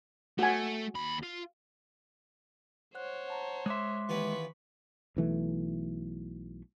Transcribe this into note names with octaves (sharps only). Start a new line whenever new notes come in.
A3 F#4 G#5
D#2 B5
F4
C5 C#5 F#5 F#6
F#5 A5 A#5
G#3 E5 C6 D6 F#6
D#2 E3 B3 B5 C#6
B1 E3 A3